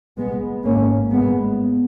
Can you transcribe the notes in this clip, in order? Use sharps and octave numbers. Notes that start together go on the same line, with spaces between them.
G#3 B3
G#1 G#2 A#3 C#4
G#3 B3